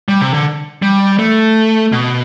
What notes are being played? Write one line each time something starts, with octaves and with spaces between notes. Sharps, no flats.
G3
C3
D3
G3
A3
B2